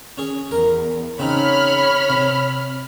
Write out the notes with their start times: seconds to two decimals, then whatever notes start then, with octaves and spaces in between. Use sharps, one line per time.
0.18 C#4 G#4
0.51 E2 A#4
1.19 C#3 C4 D#4 C#5 B5 F6
2.10 C3